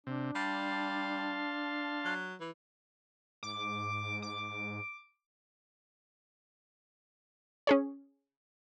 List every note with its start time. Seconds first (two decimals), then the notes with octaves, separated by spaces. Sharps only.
0.07 C3 D4
0.35 G3 F5 A5 C6
2.05 F#3
2.40 E3
3.43 G#2 D6
4.22 D6
7.67 C#4 G#4 C#5